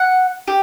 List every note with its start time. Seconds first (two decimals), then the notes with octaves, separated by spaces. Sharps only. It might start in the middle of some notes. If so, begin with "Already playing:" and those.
Already playing: F#5
0.48 G4